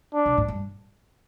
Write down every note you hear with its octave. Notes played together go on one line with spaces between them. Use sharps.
D4
C3
A2
G2